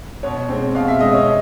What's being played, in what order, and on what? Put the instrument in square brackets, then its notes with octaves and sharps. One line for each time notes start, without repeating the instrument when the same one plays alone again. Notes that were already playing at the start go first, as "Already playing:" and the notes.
[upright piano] B2 C#5
G#3 C4
B2 F5
E5
G#3 C4 D#5
C#5